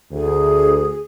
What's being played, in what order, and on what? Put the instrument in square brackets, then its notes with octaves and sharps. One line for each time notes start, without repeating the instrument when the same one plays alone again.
[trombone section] D2 [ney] G#4